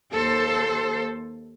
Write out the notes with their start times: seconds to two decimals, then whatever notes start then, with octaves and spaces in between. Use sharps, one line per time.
0.13 D#2 A4 C5